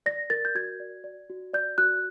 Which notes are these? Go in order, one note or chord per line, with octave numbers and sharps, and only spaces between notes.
D5 A#6
A#4 A6
G6
F#4 G#6
D5
D5
F#4
D5 G6
F#4 F#6